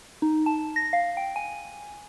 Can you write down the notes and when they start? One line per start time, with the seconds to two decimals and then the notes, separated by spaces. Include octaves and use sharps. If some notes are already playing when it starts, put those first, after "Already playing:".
0.22 D#4
0.46 A5
0.76 A#6
0.93 F5
1.17 G5
1.36 G#5